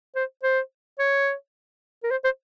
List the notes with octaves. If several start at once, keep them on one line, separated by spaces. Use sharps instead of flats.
C5
C5
C#5
A#4
C5
C5